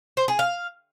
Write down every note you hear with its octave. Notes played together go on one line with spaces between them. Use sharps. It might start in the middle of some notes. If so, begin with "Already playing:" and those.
C5
G#4
F5